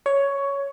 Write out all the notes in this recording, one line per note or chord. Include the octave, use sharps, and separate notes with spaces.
C#5